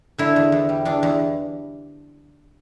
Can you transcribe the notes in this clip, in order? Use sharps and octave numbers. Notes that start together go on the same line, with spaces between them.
D3 E4
E2
E2
G3
E2 D4
E2